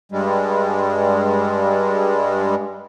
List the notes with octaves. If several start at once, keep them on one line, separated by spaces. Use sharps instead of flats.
G2 G3 G#3